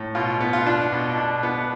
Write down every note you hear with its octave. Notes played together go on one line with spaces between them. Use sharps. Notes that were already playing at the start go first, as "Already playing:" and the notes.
Already playing: A2
B2 F4
B3
F4
D4
B2
D4
B3